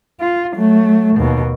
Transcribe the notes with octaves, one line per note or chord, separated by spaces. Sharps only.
F4
F#3 A3
D#2 B2